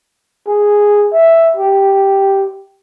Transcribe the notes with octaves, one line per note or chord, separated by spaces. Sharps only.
G#4
E5
G4